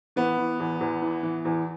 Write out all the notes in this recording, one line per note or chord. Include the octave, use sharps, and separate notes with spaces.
E3 B3
E3
E2
E2
E3
E3
E2